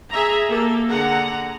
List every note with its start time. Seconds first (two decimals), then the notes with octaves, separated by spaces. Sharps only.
0.10 G#4 E5 A#5
0.48 A#3 G4 A4
0.88 D3 G#4 F#5 A#5